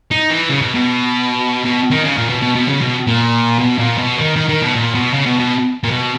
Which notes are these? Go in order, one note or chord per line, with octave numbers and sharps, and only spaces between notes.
D#4
E3
C#3
B2
B2
B2
D#3
C#3
A#2
B2
B2
B2
C#3
B2
A#2
B2
A#2
B2
D#3
D#3
D#3
B2
A#2
B2
C#3
B2
B2
A#2
B2